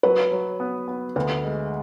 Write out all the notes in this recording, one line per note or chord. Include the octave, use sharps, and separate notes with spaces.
F#3 B4
F#3
B3
B3
D2 B4
G#3